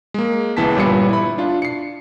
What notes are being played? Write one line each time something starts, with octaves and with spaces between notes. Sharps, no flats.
G#3 A#3
C#2 E3 B3 A5 B6
G1 A#2 G3 B4 C7 C#7
E4 B5
D4 F4
C7 C#7